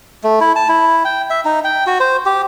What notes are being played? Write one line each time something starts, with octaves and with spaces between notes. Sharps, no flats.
A3
E4
A5
E4
G5
E5
D#4
G5
F#4
C5
G4